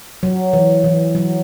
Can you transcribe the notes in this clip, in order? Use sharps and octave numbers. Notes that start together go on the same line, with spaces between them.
F#3
E3
E3
F#3